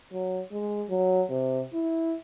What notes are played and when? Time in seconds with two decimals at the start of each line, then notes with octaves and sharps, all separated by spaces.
0.13 F#3
0.52 G#3
0.90 F#3
1.30 C3
1.73 E4